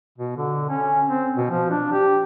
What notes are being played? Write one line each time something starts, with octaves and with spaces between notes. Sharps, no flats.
B2
D3
C#4
C4
B2
F3
D4
G4